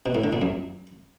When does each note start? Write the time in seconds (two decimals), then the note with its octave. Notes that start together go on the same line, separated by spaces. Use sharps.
0.06 B2
0.15 A2
0.24 D3
0.33 A#2
0.42 F#2